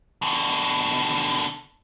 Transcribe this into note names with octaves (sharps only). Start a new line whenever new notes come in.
B2 D3